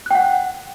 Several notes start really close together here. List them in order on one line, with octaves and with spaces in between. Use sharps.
F#6 G5 F#5